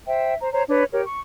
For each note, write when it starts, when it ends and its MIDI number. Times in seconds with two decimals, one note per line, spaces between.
0.06 0.34 72
0.06 0.34 76
0.06 0.34 79
0.40 0.51 72
0.40 0.51 82
0.53 0.63 72
0.53 0.63 73
0.53 0.63 82
0.68 0.84 62
0.68 0.84 71
0.68 0.84 73
0.93 1.02 67
0.93 1.02 70
0.93 1.02 73
1.05 1.21 85